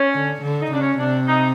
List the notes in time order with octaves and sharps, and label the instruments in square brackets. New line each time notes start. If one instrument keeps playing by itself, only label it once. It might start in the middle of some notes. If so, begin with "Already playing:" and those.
Already playing: [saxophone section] C#4
[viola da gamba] D3
D3
[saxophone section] D#4
[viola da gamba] C#3 [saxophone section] D4
[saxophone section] C#4
[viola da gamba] C3 [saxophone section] D4
[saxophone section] D#4